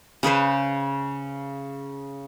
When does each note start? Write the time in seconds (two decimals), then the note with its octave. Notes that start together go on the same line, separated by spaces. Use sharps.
0.23 C#3 G#4 B4 C5